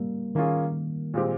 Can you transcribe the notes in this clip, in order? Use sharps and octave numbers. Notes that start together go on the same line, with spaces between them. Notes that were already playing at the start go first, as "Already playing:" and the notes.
Already playing: G3 A#3
D#3 A#3 C#4 F4 G#4
A#2 G#3 C4 G4